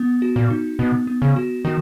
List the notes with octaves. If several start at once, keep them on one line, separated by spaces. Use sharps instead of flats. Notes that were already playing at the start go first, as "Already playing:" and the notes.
Already playing: B3
F#4
A#2
D#4
B2 B3
B3
C#3
F#4
D#3 F#4